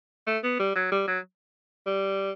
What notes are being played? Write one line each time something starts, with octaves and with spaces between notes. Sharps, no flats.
A3
B3
G3
F#3
G3
F#3
G3